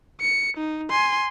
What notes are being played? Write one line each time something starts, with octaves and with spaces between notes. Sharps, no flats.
C#7
D#4
G#5 C6